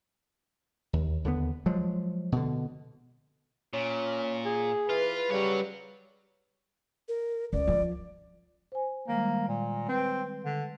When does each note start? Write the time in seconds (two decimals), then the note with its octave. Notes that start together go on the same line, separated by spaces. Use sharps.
0.93 D#2
1.24 D#2 D3 E3 B3
1.66 F3 F#3 G#3
2.32 B2 D3
3.74 A#2 C#4
4.46 G#4
4.90 E3 F4 B4
5.31 C#3 F#3 G3 C#5
7.08 A#4
7.53 C#2 D5
7.68 F3
8.72 C5 G#5
9.08 D#3 G3 G#3 A#3
9.48 A#2
9.88 C4 B4
10.45 D3